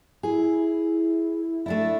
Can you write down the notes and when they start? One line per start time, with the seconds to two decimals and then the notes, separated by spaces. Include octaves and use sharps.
0.23 E4 G#4
1.66 A3 D4 E4 A6